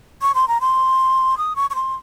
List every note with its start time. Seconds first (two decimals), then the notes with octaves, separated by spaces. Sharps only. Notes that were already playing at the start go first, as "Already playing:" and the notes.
0.22 C#6
0.35 C6
0.48 A#5
0.61 C6
1.38 D#6
1.56 C#6
1.70 C#6
1.75 C6